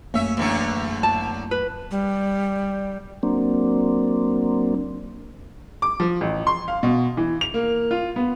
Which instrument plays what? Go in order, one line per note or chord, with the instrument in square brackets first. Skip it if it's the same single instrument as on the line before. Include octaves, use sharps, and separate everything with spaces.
[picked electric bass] F#2 A3 A#3 [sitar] C#4 E5
[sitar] E2 D3 C#4
[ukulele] A5
B4
[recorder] G3
[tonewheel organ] F#3 A#3 C4 D4
[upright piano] D6
F3
A1
C6
F5
B2
E3
F7
A#3
F4
B3